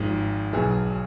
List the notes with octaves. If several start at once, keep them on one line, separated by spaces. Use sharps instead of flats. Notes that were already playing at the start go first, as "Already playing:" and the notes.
Already playing: G#1 G#2 F3
B1 B2 F#3 G#4